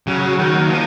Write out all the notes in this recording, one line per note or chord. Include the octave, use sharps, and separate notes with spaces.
C#3 F#3
D#3
A#3
F3